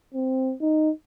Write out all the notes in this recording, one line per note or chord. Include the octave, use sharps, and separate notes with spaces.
C4
D#4